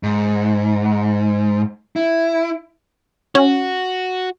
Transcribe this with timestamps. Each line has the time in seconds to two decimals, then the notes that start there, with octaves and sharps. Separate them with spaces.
0.03 G#2
1.96 E4
3.35 C#4 F#4